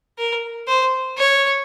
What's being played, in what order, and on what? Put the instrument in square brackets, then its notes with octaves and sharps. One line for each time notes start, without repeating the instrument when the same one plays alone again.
[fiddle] A#4
C5
C#5